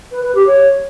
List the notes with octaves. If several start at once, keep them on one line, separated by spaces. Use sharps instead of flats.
B4
B4
G4
C#5